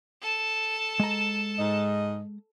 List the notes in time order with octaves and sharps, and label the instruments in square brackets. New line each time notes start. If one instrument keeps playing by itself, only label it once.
[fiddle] A4 A5
[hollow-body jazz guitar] G#3 A#5
[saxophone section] G#2 D#5